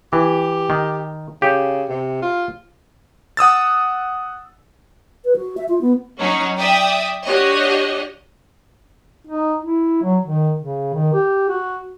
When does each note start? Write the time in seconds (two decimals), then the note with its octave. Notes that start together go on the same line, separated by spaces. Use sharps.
0.13 E3 G4
0.70 D#3
1.42 C#3 G4
1.90 C3
2.22 F4
3.37 F#5 D#6 E6 A6
5.25 B4
5.36 F#4
5.57 E5
5.69 F4
5.81 B3
6.19 F#3 C#4 D#4 F#4
6.58 D5 E5 G5 D#6
7.25 D4 F#4 G4 C#5 D#5
9.27 D#4
9.61 E4
10.03 F#3
10.25 D#3
10.60 C#3
10.94 D#3
11.13 G4
11.49 F#4